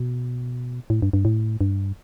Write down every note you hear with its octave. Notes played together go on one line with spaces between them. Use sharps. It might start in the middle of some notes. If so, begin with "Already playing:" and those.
Already playing: B2
A2
G2
G2
A2
G2